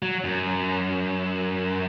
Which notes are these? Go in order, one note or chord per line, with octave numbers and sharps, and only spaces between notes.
F#3
F#2